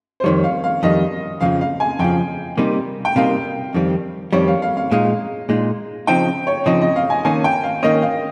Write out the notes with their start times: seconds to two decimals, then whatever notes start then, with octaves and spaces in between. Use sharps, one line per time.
0.20 C5
0.24 F2 D#3 G3 C#5
0.44 F5
0.64 F5
0.83 F2 D#3 G3 D#5
1.41 F2 C#3 F3 F5
1.61 F5
1.80 G#5
1.99 F2 C#3 F3 G5
2.58 C3 G3 A#3 D#4
3.05 G5
3.16 C3 G3 A#3 D#4 F5
3.74 F2 D#3 G3 C4
4.33 F2 D#3 G3 C4 C#5
4.47 F5
4.62 F5
4.77 F5
4.91 A#2 G#3 D#4 F5
5.49 A#2 G#3 D#4
6.07 C#3 F3 C4 D#4 G5
6.47 C#5
6.66 C#3 F3 C4 D#4 D#5
6.81 D#5
6.96 F5
7.10 G#5
7.25 D#3 A#3 C#4 G#5
7.44 G5
7.64 F5
7.83 D#3 A#3 C#4 D#5
8.02 F5